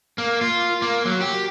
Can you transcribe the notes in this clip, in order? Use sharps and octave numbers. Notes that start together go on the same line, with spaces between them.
A#3
F4
A#3
F#3
G4